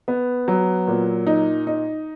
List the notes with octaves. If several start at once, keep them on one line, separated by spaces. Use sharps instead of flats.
B3
F#3
A#2
D#4
D#4